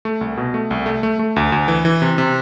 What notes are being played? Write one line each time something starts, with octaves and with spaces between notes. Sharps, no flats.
A3
C2
B2
A3
C2
A3
A3
A3
D2
D2
E3
E3
C3
C3